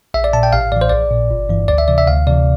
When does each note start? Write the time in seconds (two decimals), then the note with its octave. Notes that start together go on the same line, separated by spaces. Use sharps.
0.14 A#1 E5
0.24 D5
0.33 A#2 A5
0.43 G5
0.53 A1 F5
0.72 A2 E3 D5
0.81 C5
0.89 A#1 D5
1.11 A#2
1.31 G1
1.49 G2 E3
1.68 D2 D5
1.78 E5
1.88 C3 E3 D5
1.98 E5
2.07 D2 F5
2.27 C3 E3 D5